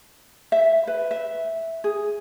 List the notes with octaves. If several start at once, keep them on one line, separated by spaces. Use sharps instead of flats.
E5
B4
E5
G#4